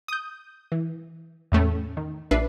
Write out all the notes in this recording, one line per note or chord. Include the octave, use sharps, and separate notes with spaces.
D#6 G6
E3
E2 A2 A3 C#4
D#3
A#1 D4 B4 E5 C7